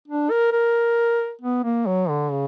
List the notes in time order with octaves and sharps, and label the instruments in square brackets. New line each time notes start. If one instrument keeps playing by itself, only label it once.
[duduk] D4
A#4
A#4
B3
A#3
F#3
D3
C#3